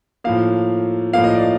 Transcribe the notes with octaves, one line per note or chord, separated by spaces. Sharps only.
A2 F3 A#3 F5
A2 F3 A#3 F5
D#5
D5